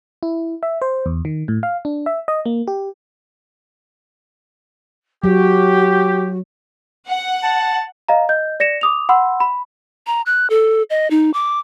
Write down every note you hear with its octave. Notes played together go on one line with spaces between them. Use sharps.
E4
E5
C5
E2
D#3
A2
F5
D4
E5
D#5
A#3
G4
F#3 F#4 G4
F#5
A5
D#5 F5 A#5
D#5 G6
D5 A#6 C#7 E7
D6 D#6 F7
F#5 B5 C6 E6
B5
A#5
F#6
A4
D#5
D#4
D6